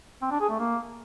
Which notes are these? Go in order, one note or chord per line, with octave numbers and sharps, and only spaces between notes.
C4
D4
G#4
A3
A#3